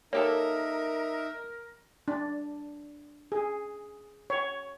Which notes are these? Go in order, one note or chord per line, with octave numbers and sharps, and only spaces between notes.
A#3 D#4 G4 A4 A#4 C#5 E5
D4
G#4
C#5